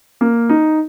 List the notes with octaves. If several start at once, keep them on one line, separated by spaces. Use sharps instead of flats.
A#3
D#4